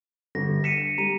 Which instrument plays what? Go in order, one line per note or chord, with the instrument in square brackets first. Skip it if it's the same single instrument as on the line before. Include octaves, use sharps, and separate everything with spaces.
[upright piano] G1 [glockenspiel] A#6
[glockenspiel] B6 C#7 D#7 [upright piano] E7
[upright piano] G3 [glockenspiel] A#5 D#7